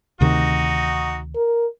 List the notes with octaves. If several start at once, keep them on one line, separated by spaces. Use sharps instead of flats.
D2 C3 D#3 D#4 F#4
A#4